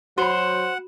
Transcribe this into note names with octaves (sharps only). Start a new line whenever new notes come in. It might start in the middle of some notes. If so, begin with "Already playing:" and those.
F#3 F#4 C5 F#5 B5